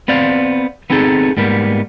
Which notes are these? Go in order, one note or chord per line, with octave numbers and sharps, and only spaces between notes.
B3 C4 D5 F5
B3 C4 D#4 G#4 A4
G#2 G3 A#3 B3